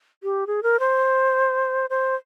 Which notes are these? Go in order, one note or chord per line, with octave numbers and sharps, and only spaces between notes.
G4
G#4
A#4
C5
C5